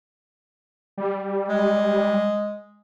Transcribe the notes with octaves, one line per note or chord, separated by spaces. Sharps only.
G3
G#3